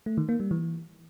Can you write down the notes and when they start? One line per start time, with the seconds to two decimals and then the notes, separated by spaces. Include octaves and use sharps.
0.06 A3
0.17 D#3
0.29 A#3
0.40 G3
0.51 E3